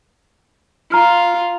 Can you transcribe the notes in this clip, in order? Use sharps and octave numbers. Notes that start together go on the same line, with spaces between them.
F4 A#5 F6